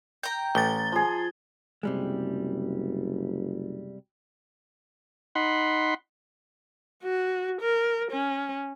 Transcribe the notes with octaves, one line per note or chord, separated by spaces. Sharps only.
G5 A#5 G6
A1 A6 G7
F3 G#4
F#1 C3 G3 G#3
D#4 F#5 B5 C6
F#4
A#4
C#4